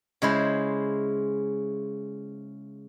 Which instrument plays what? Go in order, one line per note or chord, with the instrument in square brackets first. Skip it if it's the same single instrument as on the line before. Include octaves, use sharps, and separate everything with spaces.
[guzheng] C#3 G#3 E4 C5